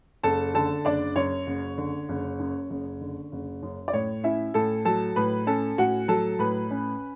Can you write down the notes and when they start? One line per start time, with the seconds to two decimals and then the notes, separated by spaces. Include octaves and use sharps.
0.23 F#1 A4 A5
0.54 D3 A4 A5
0.85 F#1 D4 D5
1.16 F#2 C#5
1.47 F#1
1.78 D3
2.09 F#1
2.40 F#2
2.70 F#1
3.01 D3
3.32 F#1
3.63 F#2
3.88 D5
3.93 A2 C#5
4.24 C#4 E4 E5
4.54 A2 A4 A5
4.85 F#3 A4 A5
5.16 A2 B4 B5
5.47 C#4 A4 A5
5.78 A2 F#4 F#5
6.08 F#3 A4 A5
6.39 A2 B4 B5
6.71 C#4